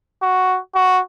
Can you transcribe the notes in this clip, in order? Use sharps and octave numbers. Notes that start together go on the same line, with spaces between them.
F#4
F#4